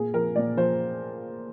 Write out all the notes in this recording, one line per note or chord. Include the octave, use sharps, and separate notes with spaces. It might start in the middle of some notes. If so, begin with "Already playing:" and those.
Already playing: A#2 G#4
F3 A#4
A#2 D5
F3 C5